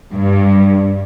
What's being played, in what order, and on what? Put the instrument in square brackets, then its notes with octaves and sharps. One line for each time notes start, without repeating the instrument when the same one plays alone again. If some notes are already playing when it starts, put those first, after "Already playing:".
[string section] G2